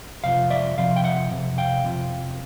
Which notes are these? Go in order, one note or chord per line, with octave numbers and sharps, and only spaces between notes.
F2 C3 F3 F5
D5 E5
F2 C3 F3 F5
G5
E5 F#5
F2 C3
F5 G5
F2 C3 F3